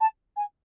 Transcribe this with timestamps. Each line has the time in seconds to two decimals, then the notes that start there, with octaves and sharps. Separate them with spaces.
0.01 A5
0.37 G#5